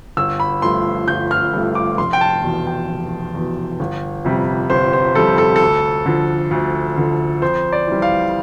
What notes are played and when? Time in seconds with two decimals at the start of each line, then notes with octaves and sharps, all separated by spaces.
0.17 G1 E6
0.40 B5
0.62 G2 F3 A3 C6
1.07 G1 G6
1.31 F6
1.54 G2 F3 A3
1.75 D6
1.98 F1 C6
2.13 G5
2.21 A5
2.44 E2 B2
2.67 G5
2.89 F1
3.35 E2 B2
3.80 G1
4.25 F2 C3 G3
4.70 G1 C5
4.93 C5
5.15 F2 C3 G3 A4
5.38 A4
5.56 A4
5.61 D2
6.06 D3 F3
6.51 D2
6.97 D3 F3
7.42 F2 C5
7.73 D5
7.87 E3 G3
8.02 F5